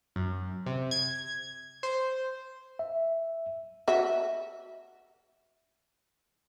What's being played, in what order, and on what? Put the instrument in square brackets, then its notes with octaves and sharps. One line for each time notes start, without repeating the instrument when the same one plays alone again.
[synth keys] F#2
C3
G#6
C5
[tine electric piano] E5
[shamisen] F#4 E5